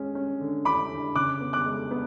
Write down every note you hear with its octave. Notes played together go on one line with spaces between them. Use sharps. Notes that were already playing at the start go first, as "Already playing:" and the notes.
Already playing: G#3 C#4
C#4
D3
D3 B5 D6
D3
C#3 D6 F#6
B3
D6 F#6
G#3
B3